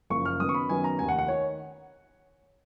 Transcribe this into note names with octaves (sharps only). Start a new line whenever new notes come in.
F#1 F#2 F3 A#3 C#6
F6
F#2 D#3 F#3 B3 D#6
C#6
B5
F#2 D#3 F#3 B3 G#5
A#5
F1 D#2 D#3 G#5
F#5
F#5
D#3 C#5